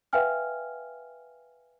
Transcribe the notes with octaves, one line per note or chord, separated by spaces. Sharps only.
B4 E5 F5 G5 G#5 F6